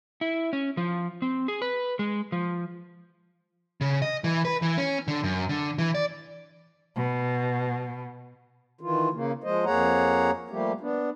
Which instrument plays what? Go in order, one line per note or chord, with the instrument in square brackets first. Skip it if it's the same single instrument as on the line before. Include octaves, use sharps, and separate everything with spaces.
[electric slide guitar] E4
C#4
F3
C4
G#4
B4
G#3
F3
[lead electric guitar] C#3
D#5
E3
B4
E3
C#4
D3
F#2
D3
E3
D5
[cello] B2
[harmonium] D#3 E3 F4
C#3 A#3
F3 G#3 C5 D#5
F2 A#3 G#4 C#5 F#5 A#5
F3 G3 A3 A#3 G4
B3 D4